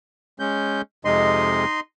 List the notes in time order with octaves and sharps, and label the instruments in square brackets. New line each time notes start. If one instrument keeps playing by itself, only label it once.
[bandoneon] G#3 C#4 G6
[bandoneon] F2 C3 G#3 [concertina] D#4 D#5 C6